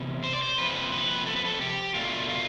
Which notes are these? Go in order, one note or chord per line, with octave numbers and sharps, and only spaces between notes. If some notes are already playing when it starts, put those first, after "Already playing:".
Already playing: C3 E3 B3
C5
D5
C5
F2 C3 F3 B4
B4
A4
B4
A4
G4
B2 A3 D4 F4
F4